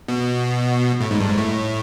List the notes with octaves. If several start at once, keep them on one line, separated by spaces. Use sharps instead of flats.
B2
A2
G#2
G2
G#2
A2